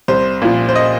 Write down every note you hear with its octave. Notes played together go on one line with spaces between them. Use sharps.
C2 C5
A#2 F3
C5
D#5